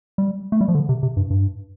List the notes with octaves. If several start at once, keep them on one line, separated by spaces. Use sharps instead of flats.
G3
A3
G3
F3
D3
C3
C3
G2
G2